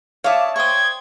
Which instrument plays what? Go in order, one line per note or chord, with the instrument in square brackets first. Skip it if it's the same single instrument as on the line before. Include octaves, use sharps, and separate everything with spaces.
[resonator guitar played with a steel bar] C#5 D5 E5 [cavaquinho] F5 D#6 [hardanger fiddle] A5
[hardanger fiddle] C5 G5 [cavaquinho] C#6 D#6 [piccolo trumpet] G#6